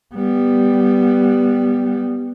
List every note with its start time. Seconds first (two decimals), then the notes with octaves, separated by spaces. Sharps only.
0.14 G3 B3